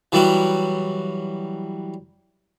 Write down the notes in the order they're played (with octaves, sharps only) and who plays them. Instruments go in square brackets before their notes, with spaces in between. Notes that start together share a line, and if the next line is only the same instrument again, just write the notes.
[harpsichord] E3 F#3 G3 E4 F#4